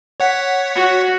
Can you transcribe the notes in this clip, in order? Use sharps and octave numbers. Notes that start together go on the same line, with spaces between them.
C#5 F#5 B6
F#4